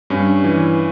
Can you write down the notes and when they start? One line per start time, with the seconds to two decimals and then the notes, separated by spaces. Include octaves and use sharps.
0.10 G2 C#4
0.44 E3